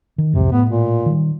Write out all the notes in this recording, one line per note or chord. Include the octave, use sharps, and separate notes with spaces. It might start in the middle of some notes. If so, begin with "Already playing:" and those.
D#3
C2 F2 G#2 C3
A2 B3
A#2
D#3 G3